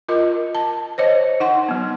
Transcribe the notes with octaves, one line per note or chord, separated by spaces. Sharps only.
F4 A#4 D#5
A5
C5 C#5 D#5
D#4 F#5 C6
F#3 B3